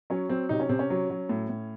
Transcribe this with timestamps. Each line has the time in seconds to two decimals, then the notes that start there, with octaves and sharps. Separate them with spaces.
0.10 F#3 C#4
0.29 F#3 C4
0.49 C3 D#4
0.60 C#4
0.69 C3 C4
0.79 C#4
0.90 F#3
1.10 F#3
1.29 A2
1.49 A2